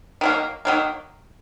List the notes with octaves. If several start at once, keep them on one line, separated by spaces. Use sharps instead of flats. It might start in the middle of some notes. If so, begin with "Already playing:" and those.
D#3 F#3 A#3
D#3 F#3 A#3